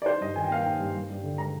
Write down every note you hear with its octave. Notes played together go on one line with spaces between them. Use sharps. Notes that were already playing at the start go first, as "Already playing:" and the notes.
D5
D#4 C5
G2 D#5
D#3 G#5
G5
A#3 F5
G5
D#4
G2
G2
G2
D3
G#3 A#5